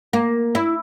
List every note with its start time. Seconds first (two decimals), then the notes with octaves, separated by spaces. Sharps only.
0.13 A#3
0.55 E4